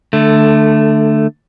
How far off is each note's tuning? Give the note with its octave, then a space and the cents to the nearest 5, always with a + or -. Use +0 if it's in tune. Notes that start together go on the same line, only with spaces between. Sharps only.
D3 +20 A3 +0